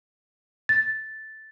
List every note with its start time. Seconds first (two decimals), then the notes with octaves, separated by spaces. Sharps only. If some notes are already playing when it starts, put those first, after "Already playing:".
0.69 A6